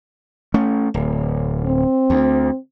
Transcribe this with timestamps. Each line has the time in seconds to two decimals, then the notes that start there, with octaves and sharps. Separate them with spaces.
0.54 A3 C#4
0.94 D1
1.65 C4
2.10 D2